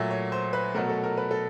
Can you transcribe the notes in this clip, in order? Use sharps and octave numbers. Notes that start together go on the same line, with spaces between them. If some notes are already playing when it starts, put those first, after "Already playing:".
Already playing: A#2 F#3 A3 E5
C#5
C5
B4
B2 F#3 A3 A#4
A4
A#4
B4
A4